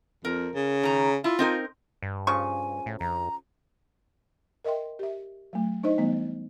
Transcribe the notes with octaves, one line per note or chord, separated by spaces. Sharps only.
F2 A#4
C#3
D#3 A#5
E4 F4
C4 D#4 A#4
G2
C#3 F3 G#5 C#6
A2
F2 A#5
A#4 D#5 E5 G5 C6
G4 E5
F#3 A3
D4 D#4 C5 D#5
E3 G3 A3 B3